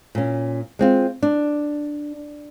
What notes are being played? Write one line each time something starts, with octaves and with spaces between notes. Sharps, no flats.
A#2 C#4
G#3 C4 F4
D4